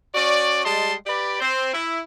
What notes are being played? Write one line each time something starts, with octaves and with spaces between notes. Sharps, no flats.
C#4 F#4 D5
G3 G#3 D#5 A5 C6
G4 B4 D5
C4 C5
E4